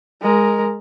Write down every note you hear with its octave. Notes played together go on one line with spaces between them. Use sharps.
G#3 A#4